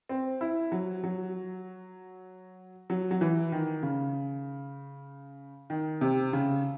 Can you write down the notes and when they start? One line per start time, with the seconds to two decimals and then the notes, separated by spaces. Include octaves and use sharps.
0.09 C4
0.41 E4
0.72 F#3
1.04 F#3
2.90 F#3
3.11 F#3
3.21 E3
3.52 D#3
3.83 C#3
5.70 D#3
6.01 C3
6.33 C#3